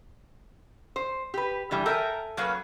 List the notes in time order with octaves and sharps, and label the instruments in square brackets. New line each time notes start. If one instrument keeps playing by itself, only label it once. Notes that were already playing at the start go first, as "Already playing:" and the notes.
[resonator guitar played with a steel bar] C5
G4 B4
D3 E3 G3
[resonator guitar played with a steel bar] A4 E5 G#5 [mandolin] A#4 G5
[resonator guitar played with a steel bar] F#3 [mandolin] A#3 C#4 B4